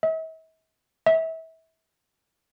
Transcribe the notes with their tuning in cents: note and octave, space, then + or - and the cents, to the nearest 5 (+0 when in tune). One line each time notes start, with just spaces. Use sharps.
E5 -45
E5 -30